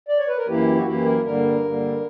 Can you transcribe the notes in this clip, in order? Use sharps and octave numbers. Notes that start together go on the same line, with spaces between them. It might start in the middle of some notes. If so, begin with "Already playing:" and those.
D5
C#5
B4
A#4
F#2 E3 A#3 E4 G4
F#4
F#2 E3 A#3 E4 G4
A#4
G2 D3 G3 A#3 A#4
G2 D3 G3 A#3